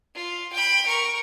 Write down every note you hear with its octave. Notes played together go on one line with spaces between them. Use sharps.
F4
G5 B5
A#4 C#6